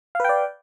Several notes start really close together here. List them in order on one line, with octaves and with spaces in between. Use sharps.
F5 B4 G5 D5